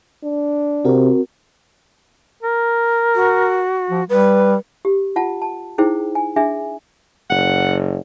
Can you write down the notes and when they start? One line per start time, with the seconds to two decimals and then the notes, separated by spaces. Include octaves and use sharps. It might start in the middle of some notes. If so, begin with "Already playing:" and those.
0.24 D4
0.85 C3 C4 F#4 A#4
2.43 A#4
3.15 F#4
3.90 F3
4.09 G3 B4
4.85 G4
5.16 F4 F#5 A5
5.42 A5
5.78 D#4 E4 G#4 C5 G5
6.15 G#5
6.36 D4 G#4 E5 G#5
7.30 F#1 F#5